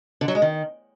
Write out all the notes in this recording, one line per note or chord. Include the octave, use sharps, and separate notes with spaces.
D3
F#3
G#3
D#3